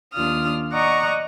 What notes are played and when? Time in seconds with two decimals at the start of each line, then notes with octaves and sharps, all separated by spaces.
0.13 D#2 D4 F4 D#6 F6
0.72 D5 D#5 F#5 A#5 C#6